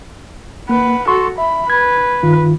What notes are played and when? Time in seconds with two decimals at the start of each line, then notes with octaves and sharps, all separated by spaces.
0.69 A#3 B4 F#5
1.08 F#4 A4 C6 C#6
1.38 E5 B5
1.70 B4 G#6
2.23 G2 D#3 F4